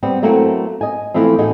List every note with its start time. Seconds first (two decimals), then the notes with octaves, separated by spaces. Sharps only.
0.03 G3 B3 C4
0.22 F#3 A3 A#3 C4 E4 F#4
0.81 D#5 G#5
1.14 E3 F3 A3 C4
1.38 A2 D#4 F#4 G#4